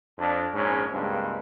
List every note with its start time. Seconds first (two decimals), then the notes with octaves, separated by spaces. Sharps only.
0.18 F2 D4
0.54 A#1 G#2 C#4
0.92 C#2 G2 G#3 A#3 C4